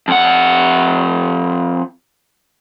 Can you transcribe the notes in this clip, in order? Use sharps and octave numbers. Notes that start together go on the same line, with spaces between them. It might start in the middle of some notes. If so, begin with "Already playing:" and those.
F2 F#5